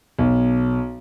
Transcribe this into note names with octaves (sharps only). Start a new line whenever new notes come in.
B1